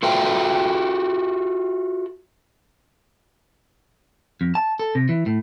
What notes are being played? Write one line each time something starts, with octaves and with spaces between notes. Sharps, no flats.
F4 F#4 A4 E5 G5 A#5
F2
A5
A4
C3
E3
A2